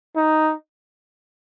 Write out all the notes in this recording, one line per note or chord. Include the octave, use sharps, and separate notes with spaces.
D#4